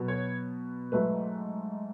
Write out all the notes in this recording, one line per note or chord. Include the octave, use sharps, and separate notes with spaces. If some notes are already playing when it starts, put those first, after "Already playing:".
Already playing: B2 F#3 B3
C#5
G#2 F#3 A3 B4